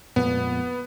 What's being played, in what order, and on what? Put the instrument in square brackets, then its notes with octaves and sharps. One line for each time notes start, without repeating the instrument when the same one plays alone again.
[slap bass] F2 A#2 G#3 [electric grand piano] B3